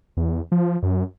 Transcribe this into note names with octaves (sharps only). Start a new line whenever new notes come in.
E2
F3
F#2